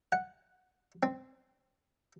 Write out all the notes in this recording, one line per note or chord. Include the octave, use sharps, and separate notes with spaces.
F#5
C4